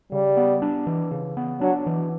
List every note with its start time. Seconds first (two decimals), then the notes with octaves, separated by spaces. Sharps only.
0.12 C#3 G3
0.37 B3
0.62 D4
0.87 E3
1.11 C#3
1.37 B3
1.61 F#3 D4
1.86 E3